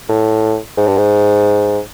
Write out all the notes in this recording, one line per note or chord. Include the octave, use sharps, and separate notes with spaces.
A2
G#2
G2
G#2